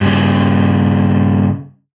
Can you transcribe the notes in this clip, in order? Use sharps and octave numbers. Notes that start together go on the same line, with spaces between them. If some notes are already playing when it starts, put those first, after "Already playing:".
G2 C#3